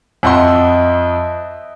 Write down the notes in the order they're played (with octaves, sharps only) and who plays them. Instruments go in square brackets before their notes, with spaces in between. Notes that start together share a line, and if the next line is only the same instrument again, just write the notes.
[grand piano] F2 F#5 C6 [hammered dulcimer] D#5 E5